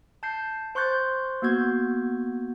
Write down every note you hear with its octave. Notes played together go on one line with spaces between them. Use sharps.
A5 G6 C7
C5 C6 C#6 F#6 G6 A6
A#3 B3 F#4 G6 G#6